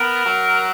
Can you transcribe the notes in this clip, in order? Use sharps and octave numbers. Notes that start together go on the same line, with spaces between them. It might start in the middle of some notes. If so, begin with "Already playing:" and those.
Already playing: B3 A#4
F#3